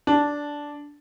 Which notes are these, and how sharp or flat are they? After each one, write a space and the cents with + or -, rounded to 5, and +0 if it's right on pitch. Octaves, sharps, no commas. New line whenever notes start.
D4 -5